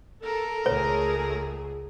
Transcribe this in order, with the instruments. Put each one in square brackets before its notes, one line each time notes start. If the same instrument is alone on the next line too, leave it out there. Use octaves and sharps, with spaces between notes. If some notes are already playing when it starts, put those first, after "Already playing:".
[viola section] A4 [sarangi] A#4
[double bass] C#2 [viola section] A3 G#4 [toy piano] C#5